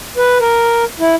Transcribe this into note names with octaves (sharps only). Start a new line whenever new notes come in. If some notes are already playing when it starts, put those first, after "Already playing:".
B4
A#4
E4